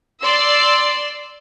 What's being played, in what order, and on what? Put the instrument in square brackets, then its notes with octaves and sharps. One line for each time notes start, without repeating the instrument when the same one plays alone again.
[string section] D5 C6 E6